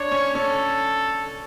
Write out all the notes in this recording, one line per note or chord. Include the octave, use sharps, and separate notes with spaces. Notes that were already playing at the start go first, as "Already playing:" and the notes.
Already playing: D4 C#5
C#4
C#4 A4